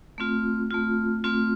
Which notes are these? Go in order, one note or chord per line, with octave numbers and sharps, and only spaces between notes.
A3 C4 F4
A3 C4 F4
A3 C4 F4